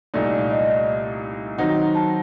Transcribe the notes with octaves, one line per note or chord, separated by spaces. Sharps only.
C2 A#2 A3 D#4 D5
D#5
D#3 F#3 C4 D#4 F#5
A5